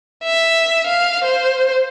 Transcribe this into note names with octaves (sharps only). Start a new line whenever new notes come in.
E5
F5
C5